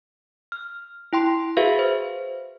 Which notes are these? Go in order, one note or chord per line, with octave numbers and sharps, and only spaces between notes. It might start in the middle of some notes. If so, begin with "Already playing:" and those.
F6
E4 G5 C6
F#4 G#4 B4 E5 F5
C5